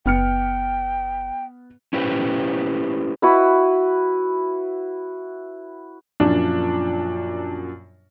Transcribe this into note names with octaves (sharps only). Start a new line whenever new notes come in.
F#1 B3 G5 F6 C#7
C#4 E4 G4 B4 C5
E4 F#4 B4
F#2 A#2 F3 D4